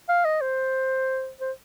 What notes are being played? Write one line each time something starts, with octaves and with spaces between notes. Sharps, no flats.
F5
D#5
C5
C5